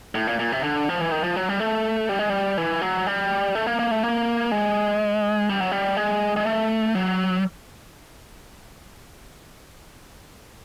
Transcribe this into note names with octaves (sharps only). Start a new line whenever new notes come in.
A2
A#2
A#2
C3
D3
F3
E3
D#3
F3
F#3
G3
A3
G3
G#3
G3
E3
F#3
G3
A3
A#3
A#3
A3
A#3
G#3
G3
F#3
G3
G#3
G#3
A3
F#3